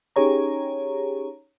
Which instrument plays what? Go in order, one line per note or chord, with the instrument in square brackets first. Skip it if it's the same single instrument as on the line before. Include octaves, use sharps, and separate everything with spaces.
[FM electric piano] C#4 D#4 G4 G#4 C#5 A#5